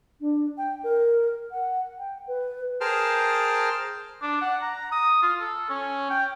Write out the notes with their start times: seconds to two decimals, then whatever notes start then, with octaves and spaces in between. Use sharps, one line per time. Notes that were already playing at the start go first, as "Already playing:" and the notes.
0.21 D4
0.58 G5
0.84 A#4
1.51 F#5
1.99 G5
2.28 B4
2.81 G#4 A#4 C5 G5 A5 F6
4.22 D4
4.41 F#5
4.61 A#5
4.92 D#6
5.22 F4
5.40 A4
5.69 C#4
6.10 G5